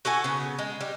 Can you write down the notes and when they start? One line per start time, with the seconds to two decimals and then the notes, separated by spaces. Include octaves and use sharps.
0.05 F#4 A4 F#5 G#5
0.24 C#3 B3
0.59 G#3
0.81 G3